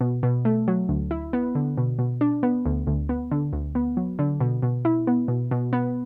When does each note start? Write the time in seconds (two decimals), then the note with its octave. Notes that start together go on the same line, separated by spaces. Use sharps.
0.01 B2
0.23 B2
0.45 A3
0.68 F#3
0.89 D2
1.11 E4
1.33 B3
1.55 D3
1.78 B2
1.99 B2
2.21 D4
2.43 B3
2.66 D2
2.87 D2
3.09 B3
3.31 D3
3.53 D2
3.75 B3
3.97 F#3
4.19 D3
4.40 B2
4.62 B2
4.85 E4
5.07 B3
5.28 B2
5.51 B2
5.73 B3